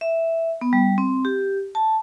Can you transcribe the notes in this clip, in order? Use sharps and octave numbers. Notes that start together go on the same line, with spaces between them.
E5
B3
G3
C4
G4
A5